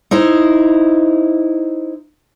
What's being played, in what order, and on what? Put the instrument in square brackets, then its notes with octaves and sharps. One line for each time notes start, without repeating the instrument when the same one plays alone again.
[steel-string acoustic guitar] D#4 E4 C5